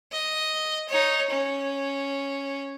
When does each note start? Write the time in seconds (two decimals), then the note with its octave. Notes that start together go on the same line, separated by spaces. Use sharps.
0.12 D#5
0.89 D#4 C#5
1.30 C#4